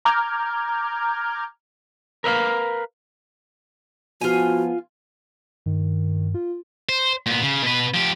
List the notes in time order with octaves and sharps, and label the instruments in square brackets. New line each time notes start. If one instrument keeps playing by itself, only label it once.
[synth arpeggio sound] A#5 D6 F6 G6 G#6
[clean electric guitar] A#4 B4 E5 F5
[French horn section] F3 B3 [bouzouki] F4 G#5 [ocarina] F#4
[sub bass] G2 [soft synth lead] D#3
[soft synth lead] F4
[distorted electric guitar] C5
A#2 B3
C#3
B2 B4
F3 G4